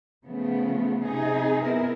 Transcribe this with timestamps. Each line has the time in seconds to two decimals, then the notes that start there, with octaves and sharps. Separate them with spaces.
0.25 C#3 F3 A3 B3
1.04 C3 D#4 G#4
1.61 B3 E4 A#4